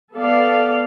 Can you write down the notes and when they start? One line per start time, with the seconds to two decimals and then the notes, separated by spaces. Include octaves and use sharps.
0.15 B3 A4 D5 F5